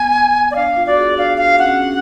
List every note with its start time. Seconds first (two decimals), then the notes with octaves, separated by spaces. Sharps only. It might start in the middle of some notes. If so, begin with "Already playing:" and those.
Already playing: B3 G#5
0.51 D5
0.56 D4 F5
0.76 F4
0.87 F#4 D5
0.97 F4 G#4
1.17 D4 F#4 F5
1.38 D4 F5
1.59 C#4 F#5